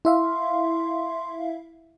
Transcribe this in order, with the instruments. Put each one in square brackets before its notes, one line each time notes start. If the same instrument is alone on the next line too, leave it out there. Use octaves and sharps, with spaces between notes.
[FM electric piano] E4 E5 F5 [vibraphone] C6